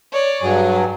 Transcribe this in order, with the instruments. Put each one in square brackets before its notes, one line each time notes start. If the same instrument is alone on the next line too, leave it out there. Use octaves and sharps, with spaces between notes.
[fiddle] C#5 D5
[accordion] G2 F#3 [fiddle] G#4